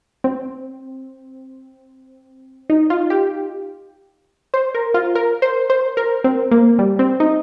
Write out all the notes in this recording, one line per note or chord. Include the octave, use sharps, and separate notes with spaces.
C4
D#4
F4
G4
C5
A#4
F4
A#4
C5
C5
A#4
C4
A#3
G3
C4
D#4